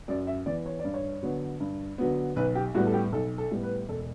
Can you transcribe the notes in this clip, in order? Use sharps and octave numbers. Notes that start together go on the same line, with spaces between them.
F#2 D5
E5
E3 B3 D5
C#5
D5
G2
C#5
D3 F#3 B3
G2
D3 F#3 B3
B1 B4
G4
A2 G3 B3 F#4
A4
G4
B1 A4
A4
A2 G3 B3
B4
E1 A4